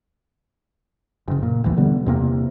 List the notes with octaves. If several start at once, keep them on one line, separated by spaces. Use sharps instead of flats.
F#1 C#3
A#2
A1 D#2 E3
B2 D3 G3 B3
E2 C3 A#3